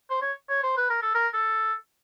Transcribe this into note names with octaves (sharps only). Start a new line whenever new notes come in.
C5
C#5
C#5
C5
B4
A#4
A4
A#4
A4